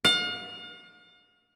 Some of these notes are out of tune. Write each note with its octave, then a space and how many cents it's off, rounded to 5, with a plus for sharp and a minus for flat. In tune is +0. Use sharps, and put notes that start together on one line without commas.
F5 +40